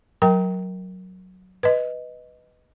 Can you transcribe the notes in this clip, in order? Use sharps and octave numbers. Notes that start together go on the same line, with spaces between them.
F#3 A#4 G5 A#5
B4 D#5